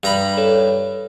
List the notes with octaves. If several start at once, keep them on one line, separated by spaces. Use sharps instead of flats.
G2 A#5 B5
A4 C#5